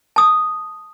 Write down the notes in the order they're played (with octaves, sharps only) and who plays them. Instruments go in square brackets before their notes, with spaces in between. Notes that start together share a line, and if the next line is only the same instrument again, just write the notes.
[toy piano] A5 D#6